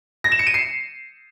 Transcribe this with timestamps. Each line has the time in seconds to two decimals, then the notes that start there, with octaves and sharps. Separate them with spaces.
0.24 A#6
0.32 E7
0.39 C#7
0.47 D#7
0.54 C7